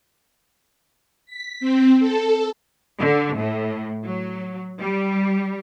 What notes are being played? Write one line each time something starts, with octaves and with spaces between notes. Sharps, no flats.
B6
C4
A4
D3
A2
F#3
G3